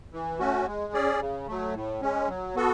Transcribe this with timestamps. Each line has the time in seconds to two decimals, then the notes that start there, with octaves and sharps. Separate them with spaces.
0.13 E3
0.39 A3 C#4 F#4
0.67 G#3
0.93 C#4 G#4 D5
1.20 C#3
1.48 F#3 A3
1.74 A2
2.02 G#3 C#4
2.28 F#3
2.56 B3 F#4 A4